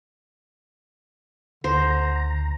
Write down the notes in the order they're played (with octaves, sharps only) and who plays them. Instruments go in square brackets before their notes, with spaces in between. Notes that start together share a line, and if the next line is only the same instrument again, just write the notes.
[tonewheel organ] D2 A#5 [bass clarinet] D3 [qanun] C5